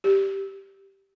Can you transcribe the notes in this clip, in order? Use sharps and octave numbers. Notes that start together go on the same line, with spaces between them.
G4